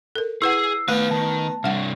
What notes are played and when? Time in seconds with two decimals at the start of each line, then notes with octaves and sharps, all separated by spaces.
0.15 A4 A#4
0.42 E4 G#4 B4 F#5 E6 C7
0.88 D#3 A3 B3 F5
1.11 D#3 A5
1.64 C3 G3 D4 F#5